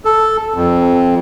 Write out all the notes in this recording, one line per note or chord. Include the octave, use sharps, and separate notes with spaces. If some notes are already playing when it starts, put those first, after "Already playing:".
A4
F2